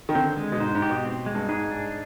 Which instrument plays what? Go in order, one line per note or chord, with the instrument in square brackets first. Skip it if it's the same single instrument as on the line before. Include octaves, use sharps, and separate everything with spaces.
[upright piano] D#3
[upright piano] D3 [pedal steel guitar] C4
[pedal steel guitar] G#3
[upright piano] B2
[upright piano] G#2 [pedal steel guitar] C5
[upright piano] G#2
[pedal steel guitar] G4
[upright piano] B2
[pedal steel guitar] C4
G#3
[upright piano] G2
[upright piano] G#2 [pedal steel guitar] G#4
[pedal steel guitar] D4